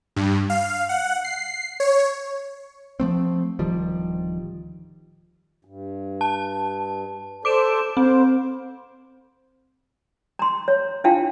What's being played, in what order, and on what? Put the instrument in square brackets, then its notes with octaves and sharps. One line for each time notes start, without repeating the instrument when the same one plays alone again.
[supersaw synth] G2
F5
F#5
C7
C#5
[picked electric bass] F3 A3 C4
D1 D#3 F3 G3
[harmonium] G2
[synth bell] A5
[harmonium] A4 C5 D5 [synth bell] D6 D7 E7
[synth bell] C4 [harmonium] C5
[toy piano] A#5 C6
C#5
D4 E4 F4 F5 G5 A5